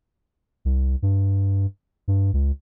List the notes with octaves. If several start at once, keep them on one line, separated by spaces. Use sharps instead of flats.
C2
G2
G2
C#2